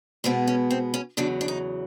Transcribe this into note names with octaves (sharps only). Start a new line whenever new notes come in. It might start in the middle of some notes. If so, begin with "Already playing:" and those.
B2 G#3 B3 C4
C#4
C4
C#4
E2 C#3 F#3 D4
D4
D#4